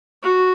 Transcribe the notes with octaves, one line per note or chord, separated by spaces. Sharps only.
F#4